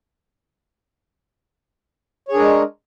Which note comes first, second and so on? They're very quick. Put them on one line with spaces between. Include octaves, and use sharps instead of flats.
C#5 G#4 D4 A#4 G#3